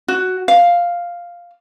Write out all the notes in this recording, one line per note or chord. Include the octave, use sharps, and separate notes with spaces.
F#4
F5